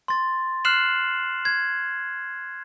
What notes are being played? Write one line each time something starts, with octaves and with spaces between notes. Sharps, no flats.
C6 A6
F6 F#6 C7 E7 F#7
G#6